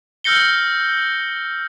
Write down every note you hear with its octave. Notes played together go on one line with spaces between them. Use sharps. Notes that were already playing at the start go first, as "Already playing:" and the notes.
E6 F6 G6 A#6 C#7 G7